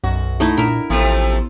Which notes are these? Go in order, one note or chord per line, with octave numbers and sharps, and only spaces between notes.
B1 F#2 F#4
A3 D#4 E4
A#2 D4 A#4 E5
A1 C3 F3 A3 B3 C6 E6